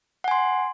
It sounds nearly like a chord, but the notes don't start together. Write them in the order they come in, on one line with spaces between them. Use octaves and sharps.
F#5 G#5 C6